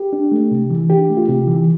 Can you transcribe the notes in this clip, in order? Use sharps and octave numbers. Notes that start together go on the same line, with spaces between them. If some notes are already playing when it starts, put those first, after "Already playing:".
Already playing: G4
D4
A3
C3
E3
D4 G4
A3
F4
C3 G4
E3